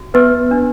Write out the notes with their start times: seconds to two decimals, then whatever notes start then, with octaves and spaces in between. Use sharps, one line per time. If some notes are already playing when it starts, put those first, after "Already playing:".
Already playing: F#4
0.14 B3 B4
0.51 D4